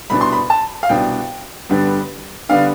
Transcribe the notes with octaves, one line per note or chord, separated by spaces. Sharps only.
C2 B2 B3 D4 B5
C6
B5
A5
F5
C2 B2 B3 D4 G5
G2 D3 G3 B3 D4
D3 G3 B3 D4 F5